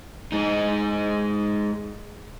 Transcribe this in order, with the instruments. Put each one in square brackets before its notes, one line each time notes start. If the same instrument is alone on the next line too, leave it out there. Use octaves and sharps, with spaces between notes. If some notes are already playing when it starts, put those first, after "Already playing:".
[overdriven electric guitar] G#3 D#4